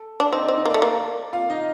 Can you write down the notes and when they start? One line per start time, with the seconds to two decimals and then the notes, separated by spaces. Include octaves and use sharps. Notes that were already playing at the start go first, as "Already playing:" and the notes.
Already playing: A4
0.20 D4
0.32 C4 D#4 D#5
0.45 C4 D5
0.57 D#4 D#5
0.65 A#3
0.70 A3 D5
0.82 A#3
1.33 F4 F5
1.50 D#4 D#5